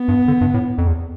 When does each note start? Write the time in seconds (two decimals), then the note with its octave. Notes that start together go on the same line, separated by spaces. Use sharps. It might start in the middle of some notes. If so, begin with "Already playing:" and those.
Already playing: B3
0.08 G2
0.28 D3
0.41 G2
0.54 A2
0.78 F2
0.87 E2